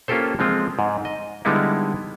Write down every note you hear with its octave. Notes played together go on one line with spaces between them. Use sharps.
A#3 C#4 F4 G4 A4 C5
F3 G#3 C4 F4
G#2
D#5
D3 G3 G#3 B3 D#4 E4